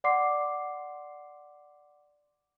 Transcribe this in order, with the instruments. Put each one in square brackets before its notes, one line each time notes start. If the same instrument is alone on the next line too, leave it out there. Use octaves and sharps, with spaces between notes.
[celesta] D5 F#5 C6 D6 C7